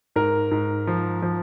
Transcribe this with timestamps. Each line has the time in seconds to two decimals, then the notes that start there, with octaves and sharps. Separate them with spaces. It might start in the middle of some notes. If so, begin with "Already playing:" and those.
0.16 G#2 A#4
0.51 G#2
0.87 F3
1.22 F3